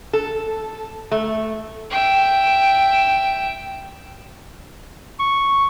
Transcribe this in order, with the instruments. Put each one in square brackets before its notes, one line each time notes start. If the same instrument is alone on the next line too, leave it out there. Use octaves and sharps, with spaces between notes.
[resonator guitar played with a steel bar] A4
A3
[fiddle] E5 G5
[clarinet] C#6